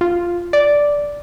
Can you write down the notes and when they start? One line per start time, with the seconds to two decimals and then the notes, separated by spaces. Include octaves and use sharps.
0.01 F4
0.53 D5